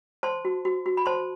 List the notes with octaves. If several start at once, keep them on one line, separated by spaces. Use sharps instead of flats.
C5 A5 C6
F#4
F#4
F#4
B5
C5 A5 C6